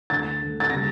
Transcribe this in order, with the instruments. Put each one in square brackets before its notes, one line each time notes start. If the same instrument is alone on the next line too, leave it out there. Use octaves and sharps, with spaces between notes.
[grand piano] D2 D3 A3 [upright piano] A6
[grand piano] D2 D3 A3
[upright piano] A6
[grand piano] C#3 G3 A#3 [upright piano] A#6